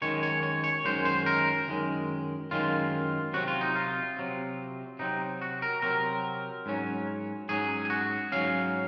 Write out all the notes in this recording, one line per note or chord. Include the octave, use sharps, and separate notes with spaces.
F#2 D#3 G#3 C#5
C#5
C#5
C#5
F#2 D#3 G#3 C5
C5
A#4
F#2 D#3 G#3
F#2 D#3 G#3 F4
C3 F#3 C4 F#4
F4
D#4
F4
C3 F#3 C4
C3 F#3 C4 D#4
F#4
A#4
C3 F#3 C4 A#4
G#2 F#3 C#4
G#2 F#3 C#4 G#4
G#4
F#4
G#2 F#3 C#4 F5